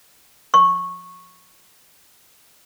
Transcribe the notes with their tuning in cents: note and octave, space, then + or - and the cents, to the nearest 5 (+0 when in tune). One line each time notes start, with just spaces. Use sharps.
C#6 -10